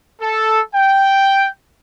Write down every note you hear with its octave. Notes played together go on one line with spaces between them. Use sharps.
A4
G5